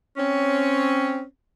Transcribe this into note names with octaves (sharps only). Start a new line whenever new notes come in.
C4 C#4